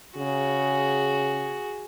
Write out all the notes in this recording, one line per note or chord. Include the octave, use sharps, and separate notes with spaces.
C#3 F#4 G#4